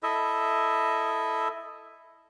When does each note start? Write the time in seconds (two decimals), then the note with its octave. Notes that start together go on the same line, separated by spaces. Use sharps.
0.03 E4 A4 D#5 E5